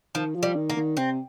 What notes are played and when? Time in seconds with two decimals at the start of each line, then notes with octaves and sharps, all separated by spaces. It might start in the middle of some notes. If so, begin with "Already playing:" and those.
0.15 D#3 F3
0.35 F3
0.43 G3
0.55 D#3
0.70 A#3
0.76 D#3
0.97 C3 C4